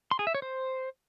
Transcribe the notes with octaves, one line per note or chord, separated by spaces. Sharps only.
C6
G#4
E5
C#5
C5